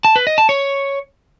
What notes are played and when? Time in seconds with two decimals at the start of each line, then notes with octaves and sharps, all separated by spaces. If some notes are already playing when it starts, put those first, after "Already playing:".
0.05 A5
0.16 B4
0.27 D#5
0.38 A5
0.49 C#5